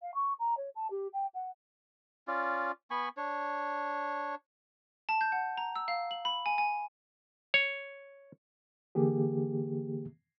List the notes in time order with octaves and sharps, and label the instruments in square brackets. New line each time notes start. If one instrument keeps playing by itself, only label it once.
[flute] F5
C#6
A#5
C#5
A5
G4
G5
F#5
[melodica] C#4 F4 D5
B3 G#5 B5 C#6
D4 C#5
[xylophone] A5
G6
F#5
A#5
E6
F5
F#7
B5
G#5
G#5
[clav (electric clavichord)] C#5
[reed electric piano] D3 E3 A#3 G4 G#4